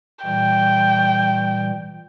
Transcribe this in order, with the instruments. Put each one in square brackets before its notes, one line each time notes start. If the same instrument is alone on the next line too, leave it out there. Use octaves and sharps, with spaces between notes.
[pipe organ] A#2 E3 G3 [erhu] G5